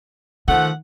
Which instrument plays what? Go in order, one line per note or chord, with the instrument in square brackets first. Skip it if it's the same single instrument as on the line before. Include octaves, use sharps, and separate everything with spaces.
[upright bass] D#3 [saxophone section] F3 A3 F#5